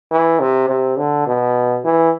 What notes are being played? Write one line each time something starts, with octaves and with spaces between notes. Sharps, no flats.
E3
C3
C3
D3
B2
E3